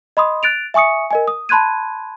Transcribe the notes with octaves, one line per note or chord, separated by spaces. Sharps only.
D#5 B5 C6 D#6
F#6 A6 D7 F7
E5 G#5 C#6 D#6 C#7
A#4 D#5 G#5
D#6
A5 B5 C6 F#6 G#6 D#7